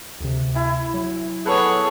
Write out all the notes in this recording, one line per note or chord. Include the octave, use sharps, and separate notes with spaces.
D2 C3
E4 G#5
F#3
B3 G#4 A4 C#5 F#5